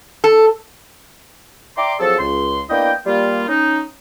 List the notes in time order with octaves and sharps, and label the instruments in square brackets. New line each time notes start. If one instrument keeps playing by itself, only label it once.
[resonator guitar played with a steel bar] A4
[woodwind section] D5 E5 G5 A#5 C6 D6
F3 F#3 C4 G#4 A4
C#2 C6
A#3 B3 D4 E4 D#5 G5
G3 A#3 F4
C#4 D#4